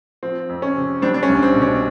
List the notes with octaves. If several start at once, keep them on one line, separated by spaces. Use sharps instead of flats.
F3 C4
F2
C#4
C3
G3 C4 D4
D4
C#4
C2
C4
B2
C#4